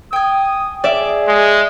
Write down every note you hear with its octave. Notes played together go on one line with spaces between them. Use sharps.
G5 G#5 D#6
G#4 D5 E5
G#3